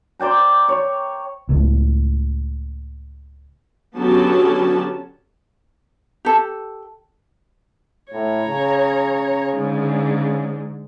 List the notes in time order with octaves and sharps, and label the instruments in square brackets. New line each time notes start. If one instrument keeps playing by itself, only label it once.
[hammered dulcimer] C5 D5 G5 A#5
C#5
[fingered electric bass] C#2 A2
[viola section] D3 F#3 B3 C#4 G4 A5
[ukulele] G4 A4
[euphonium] A2 [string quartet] C#5 A#5
[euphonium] C#3
[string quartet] G#2 D3